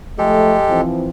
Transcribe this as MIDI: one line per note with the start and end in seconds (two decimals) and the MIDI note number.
0.18 0.56 53
0.18 0.81 56
0.18 0.56 57
0.18 0.81 67
0.18 0.81 69
0.69 1.08 52
0.69 1.08 53
0.69 1.08 60